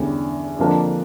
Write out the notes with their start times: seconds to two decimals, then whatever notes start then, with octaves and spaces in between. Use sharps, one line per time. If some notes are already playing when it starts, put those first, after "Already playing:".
Already playing: E2 D3 G3 C#4
0.59 F2 D3 F3 A#3 D4